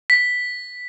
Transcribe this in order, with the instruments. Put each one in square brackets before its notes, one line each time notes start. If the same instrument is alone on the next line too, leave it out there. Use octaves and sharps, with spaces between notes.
[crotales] B6